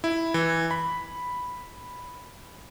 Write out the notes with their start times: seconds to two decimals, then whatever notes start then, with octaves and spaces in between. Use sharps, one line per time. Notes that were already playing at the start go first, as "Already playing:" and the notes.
0.04 E4
0.34 E3
0.71 B5